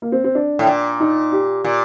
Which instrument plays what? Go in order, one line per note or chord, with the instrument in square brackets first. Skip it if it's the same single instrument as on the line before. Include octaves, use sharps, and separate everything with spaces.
[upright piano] A#3
C4
C4
D4
[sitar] A2
A#2
[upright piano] D#4
G4
[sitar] A#2